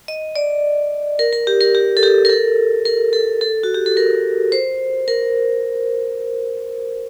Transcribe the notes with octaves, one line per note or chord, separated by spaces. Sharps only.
D#5
D5
A#4
A#4
G4
A#4
G4
A4
G4
A#4
A4
A#4
A4
A4
F#4
G4
A4
A#4
C5
A#4